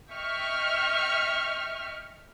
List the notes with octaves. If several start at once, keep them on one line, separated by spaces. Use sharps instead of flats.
D#5 E5 G5 C#6 F6